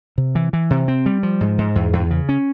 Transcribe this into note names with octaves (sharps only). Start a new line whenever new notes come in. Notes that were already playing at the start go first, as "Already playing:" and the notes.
C3
E3
E3
C3
C4
G3
F3
G#2
G#2
E2
E2
C#3
C#4